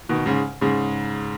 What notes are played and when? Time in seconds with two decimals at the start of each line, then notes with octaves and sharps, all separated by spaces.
0.09 B2 D#3
0.26 G#2 C#3
0.61 G#2 C#3